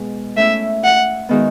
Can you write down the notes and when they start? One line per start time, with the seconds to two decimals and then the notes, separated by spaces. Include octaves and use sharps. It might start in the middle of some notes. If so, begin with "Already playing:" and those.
Already playing: B2 G#3
0.37 A3 C#4 E4 E5
0.84 F#5
1.29 D#3 G#3 B3 D#4 F#4